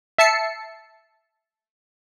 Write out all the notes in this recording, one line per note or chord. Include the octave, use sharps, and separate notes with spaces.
E5 A5 C7 C#7